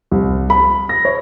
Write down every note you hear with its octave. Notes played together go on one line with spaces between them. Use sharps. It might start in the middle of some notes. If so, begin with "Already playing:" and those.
C2
B5
A#6
C#5